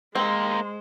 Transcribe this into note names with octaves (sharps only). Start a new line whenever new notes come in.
G#3 A#3 C4 D#4 C5